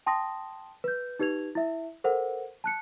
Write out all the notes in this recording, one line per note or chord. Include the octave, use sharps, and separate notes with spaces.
G5 A5 C6 D#6 A#6
B4 G6
D#4 G4 B4 G#6 F7
E4 E5
A4 A#4 C5 F#5
A5 F#6 C#7